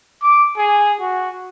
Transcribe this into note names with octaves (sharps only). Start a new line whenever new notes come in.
D6
G#4
F#4